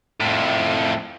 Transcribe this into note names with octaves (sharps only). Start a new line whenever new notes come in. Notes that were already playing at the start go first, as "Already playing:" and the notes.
F2 A2